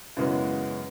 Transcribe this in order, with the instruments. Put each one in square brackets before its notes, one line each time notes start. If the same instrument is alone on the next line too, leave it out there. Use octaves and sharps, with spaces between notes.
[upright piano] F#2 C#3 E3 G#3 B3